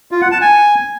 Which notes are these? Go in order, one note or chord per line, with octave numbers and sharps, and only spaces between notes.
F4
F#5
A5
G#5